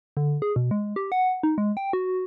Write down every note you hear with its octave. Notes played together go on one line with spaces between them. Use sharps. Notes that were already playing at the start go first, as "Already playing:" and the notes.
D3
G#4
B2
G#3
G4
F#5
D#4
G#3
G5
F#4